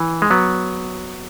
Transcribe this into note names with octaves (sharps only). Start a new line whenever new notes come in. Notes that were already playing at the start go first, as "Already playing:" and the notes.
Already playing: E3
G#3
F#3 B3